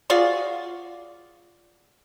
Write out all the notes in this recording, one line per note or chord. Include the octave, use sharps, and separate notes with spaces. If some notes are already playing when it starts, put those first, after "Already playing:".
F4 F#4 G#4 D5